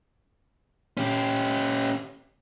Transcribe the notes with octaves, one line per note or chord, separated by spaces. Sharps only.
C#4 G4